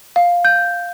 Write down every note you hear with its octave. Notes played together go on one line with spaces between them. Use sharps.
F5
G6